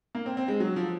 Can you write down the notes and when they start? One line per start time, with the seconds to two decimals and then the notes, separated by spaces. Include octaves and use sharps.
0.15 A#3
0.26 C4
0.37 C4
0.48 G#3
0.60 F#3
0.76 F3